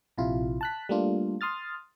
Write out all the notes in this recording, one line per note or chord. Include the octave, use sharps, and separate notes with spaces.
A#1 C3 E4 F4
A5 F#6 B6
G3 A3 A#3 D4 F4
C6 D#6 F6 A6